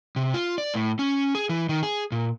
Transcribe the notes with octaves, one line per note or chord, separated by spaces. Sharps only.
C3
F4
D5
A2
C#4
G#4
E3
D#3
G#4
A#2